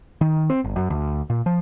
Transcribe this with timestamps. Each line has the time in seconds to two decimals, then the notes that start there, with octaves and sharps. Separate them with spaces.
0.21 D#3
0.50 C4
0.64 G1
0.76 F#2
0.90 D2
1.30 A#2
1.46 F3